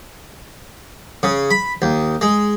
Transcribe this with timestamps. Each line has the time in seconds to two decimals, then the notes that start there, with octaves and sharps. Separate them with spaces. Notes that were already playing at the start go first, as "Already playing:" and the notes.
1.23 C#3
1.51 B5
1.82 D#2
2.21 G#3